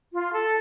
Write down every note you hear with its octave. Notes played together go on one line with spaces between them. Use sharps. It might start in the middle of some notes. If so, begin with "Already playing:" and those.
F4
A4